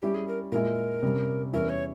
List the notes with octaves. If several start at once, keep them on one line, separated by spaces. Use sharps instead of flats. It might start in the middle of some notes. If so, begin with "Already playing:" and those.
G3 C#4 E4 G4
G#4
A#4
A#2 G#3 E4 A#4
C3 G3 C#4
E2 E3 G3 C#4 E4 A#4
C#5